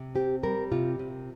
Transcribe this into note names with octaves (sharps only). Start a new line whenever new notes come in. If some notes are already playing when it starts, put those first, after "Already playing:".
Already playing: C3
C4 G4
G3 A#4
C3 F4
C3